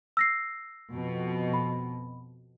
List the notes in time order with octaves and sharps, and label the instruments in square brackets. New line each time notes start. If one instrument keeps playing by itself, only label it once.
[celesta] E6 A#6 C7
[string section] F2 B2
[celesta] B5